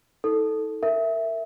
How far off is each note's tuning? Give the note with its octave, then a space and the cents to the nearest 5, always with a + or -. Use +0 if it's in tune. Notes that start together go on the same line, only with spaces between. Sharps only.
D#4 +45 A4 +0
A#4 -20 E5 +0